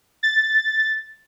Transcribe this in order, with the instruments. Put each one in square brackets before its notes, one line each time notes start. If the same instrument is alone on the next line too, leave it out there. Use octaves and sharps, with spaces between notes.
[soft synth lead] A6